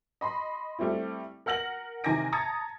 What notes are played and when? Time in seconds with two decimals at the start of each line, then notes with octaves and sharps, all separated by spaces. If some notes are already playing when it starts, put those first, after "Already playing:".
0.21 D#5 B5 C6
0.79 G3 A3 C4 E4
1.46 A#4 F#5 F6 A#6 F#7
2.04 C3 D#3 G#5 D6 A#6 D7
2.32 A5 A#5 D#6 G#6 A6 C#7